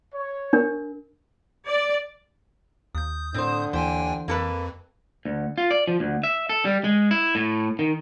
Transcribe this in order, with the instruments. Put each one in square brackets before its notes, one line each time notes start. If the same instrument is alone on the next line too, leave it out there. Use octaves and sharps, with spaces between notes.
[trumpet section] C#5
[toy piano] D4 A#4
[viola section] D5
[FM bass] D#2 [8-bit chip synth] D#6 G6
[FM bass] A2 [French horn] D3 [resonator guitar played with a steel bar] C4 C5
[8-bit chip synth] D#2 G5 G#5 [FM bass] E3 [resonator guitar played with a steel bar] C5
[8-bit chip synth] F2 [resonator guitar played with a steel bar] A#3 A4 B4
[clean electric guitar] D2
F4
D5
F3
D2
E5
A4
G3
G#3
E4
A2
D#3